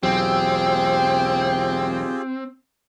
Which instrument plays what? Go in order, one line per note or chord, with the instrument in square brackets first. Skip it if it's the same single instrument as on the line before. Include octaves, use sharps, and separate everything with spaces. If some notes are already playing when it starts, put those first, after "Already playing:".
[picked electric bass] B1 E2 F#3 [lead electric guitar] C4 [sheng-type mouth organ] F4 G4 G#4 [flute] G5